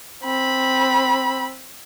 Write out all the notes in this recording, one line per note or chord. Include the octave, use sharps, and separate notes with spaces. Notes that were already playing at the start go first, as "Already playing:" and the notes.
C4 B5